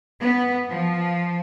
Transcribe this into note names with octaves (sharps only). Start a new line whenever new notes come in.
B3
F3